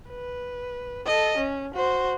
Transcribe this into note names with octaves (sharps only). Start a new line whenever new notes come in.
B4
A4 D#5
C#4
F#4 C5